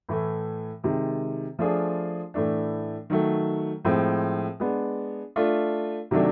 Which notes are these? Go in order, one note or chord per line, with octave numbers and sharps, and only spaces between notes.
A2 E3 A3
C3 D#3 G#3
F3 A3 D4 F4 G#4
A2 E3 A3 D4
D#3 F#3 A3
A2 F3 G#3 C4
G#3 B3 D4
A3 D4 F4
C3 D#3 F#3 A3 D4